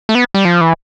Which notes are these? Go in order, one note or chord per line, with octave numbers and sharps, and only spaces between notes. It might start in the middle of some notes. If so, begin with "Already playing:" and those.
A3
B3
G3
F3
E3